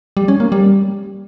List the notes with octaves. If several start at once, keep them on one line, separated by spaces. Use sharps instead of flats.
G3
C#4
A#3
G3